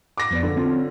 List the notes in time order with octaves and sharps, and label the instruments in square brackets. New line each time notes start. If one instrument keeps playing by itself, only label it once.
[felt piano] D6 A#6
[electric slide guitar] F2 B3 D5
[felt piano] D3
[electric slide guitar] C4 C#4 F4